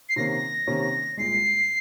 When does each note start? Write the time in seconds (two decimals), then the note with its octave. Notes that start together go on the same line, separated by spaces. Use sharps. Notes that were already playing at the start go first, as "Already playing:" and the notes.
0.09 C7
0.16 C3 D#3 A#3 C#4 A#6
0.67 C3 D#3 A#3 C#4
1.17 C2 A#2 G#3 C7